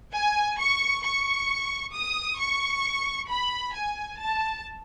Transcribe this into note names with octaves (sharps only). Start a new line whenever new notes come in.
G#5
C#6
C#6
D#6
C#6
B5
G#5
A5